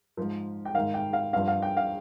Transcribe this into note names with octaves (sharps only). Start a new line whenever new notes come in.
G#2 F3
G5
G#2 D#3 F5
G5
F5
G2 F3 F5
F5
G5
F5